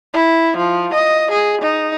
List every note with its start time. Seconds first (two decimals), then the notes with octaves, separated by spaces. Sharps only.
0.13 E4
0.57 F3
0.94 D#5
1.31 G#4
1.61 D#4